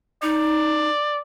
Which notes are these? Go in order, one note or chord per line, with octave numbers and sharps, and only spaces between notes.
D#4 D5